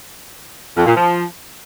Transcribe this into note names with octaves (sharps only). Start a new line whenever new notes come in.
F2
A#2
F3